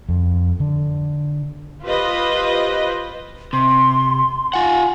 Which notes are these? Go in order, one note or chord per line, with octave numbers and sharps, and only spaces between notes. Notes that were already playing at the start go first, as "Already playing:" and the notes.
F2
D3
F4 G4 B4 C5 D#5
C3 C6
F4 F#5 G#5